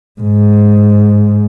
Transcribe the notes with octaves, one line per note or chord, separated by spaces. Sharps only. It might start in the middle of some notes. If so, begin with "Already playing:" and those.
G#2